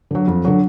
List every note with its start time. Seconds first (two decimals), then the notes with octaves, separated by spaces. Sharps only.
0.11 D3 F#3
0.28 F2
0.45 D3 F#3